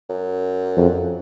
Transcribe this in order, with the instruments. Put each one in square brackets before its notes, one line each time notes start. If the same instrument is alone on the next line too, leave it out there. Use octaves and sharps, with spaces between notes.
[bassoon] F#2
[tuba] F2